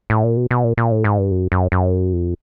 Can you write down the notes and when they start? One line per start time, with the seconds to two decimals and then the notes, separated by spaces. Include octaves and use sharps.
0.10 A2
0.24 A#2
0.37 B2
0.51 B2
0.64 A#2
0.77 A#2
0.92 A2
1.04 G#2
1.18 G2
1.31 F#2
1.52 F#2
1.72 F#2
2.13 F2